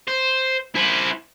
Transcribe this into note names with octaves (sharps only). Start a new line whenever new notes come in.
C5
E4 C5